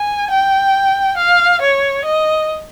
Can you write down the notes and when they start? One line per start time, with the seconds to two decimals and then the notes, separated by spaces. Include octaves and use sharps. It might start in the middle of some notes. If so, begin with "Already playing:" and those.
Already playing: G#5
0.31 G5
1.17 F5
1.61 C#5
2.05 D#5